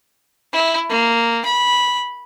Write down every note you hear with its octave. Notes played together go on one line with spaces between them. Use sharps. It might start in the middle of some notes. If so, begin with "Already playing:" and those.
E4
A#3
B5